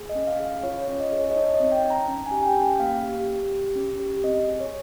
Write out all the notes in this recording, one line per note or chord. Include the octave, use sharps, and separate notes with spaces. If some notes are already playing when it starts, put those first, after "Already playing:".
Already playing: G#4
D#5
C#4
F5
G#4
F5
F4 C#5
C#5
C#4
D#5
G#4
C#5
D#5
D#4 C#5
D#5
C4
G5
D#4
A#5
C#4 A#5
G#5
G4
G5
C#4
G5
A#3 F5
G4
G4
G4
C#4
G4
C4 D#5
G#4
C#5